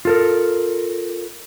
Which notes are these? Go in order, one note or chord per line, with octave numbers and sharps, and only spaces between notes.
F4 A4 A#4